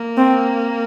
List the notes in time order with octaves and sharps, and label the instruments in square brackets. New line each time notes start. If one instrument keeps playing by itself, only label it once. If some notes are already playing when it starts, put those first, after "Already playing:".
Already playing: [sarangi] A#3
[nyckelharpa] C4